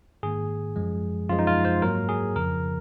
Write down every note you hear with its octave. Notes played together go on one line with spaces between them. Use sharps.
G#2 D#3 A#3 G#4
F#2 F3 G#3
F#2 F3 G#3 F4
D#4
F4
C5
G#2 F#3 A#3 A#4
G#4
F2 C#3 F3 A#4